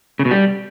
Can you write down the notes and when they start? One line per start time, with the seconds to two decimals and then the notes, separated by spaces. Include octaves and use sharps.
0.19 C#3
0.25 B2
0.31 G3